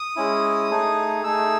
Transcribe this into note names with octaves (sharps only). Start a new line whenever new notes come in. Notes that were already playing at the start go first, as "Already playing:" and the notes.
Already playing: D#6
G#3 C#4 E4
A3 D#4 G#4
A3 D#4 G#4 E6